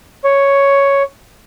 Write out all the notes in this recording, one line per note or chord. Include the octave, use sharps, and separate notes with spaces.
C#5